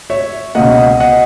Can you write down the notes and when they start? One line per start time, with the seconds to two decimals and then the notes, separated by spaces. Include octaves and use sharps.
0.10 C#5 E5
0.55 C#2 B2 A#3 D#5 F#5
1.00 D#5 F#5